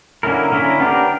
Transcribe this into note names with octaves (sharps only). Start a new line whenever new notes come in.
D3 A#3 C#4 E4 A#4
D3 A#3 C#4 E4 A#4
B3 D4 G4 A#4